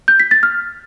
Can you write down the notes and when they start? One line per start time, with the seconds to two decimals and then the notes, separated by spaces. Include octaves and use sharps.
0.08 G6
0.20 B6
0.31 A6
0.43 F6